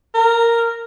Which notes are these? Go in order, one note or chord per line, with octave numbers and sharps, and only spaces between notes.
A#4